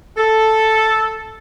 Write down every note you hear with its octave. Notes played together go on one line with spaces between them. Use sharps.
A4